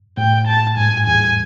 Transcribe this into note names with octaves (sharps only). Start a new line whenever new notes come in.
A2 G5
A5
G#2 G#5
E2 G#5